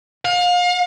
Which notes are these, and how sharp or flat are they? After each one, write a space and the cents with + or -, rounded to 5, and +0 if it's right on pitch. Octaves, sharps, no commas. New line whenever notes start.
F5 +35